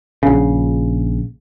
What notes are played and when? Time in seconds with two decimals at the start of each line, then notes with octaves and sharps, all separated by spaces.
0.23 A#1 C#3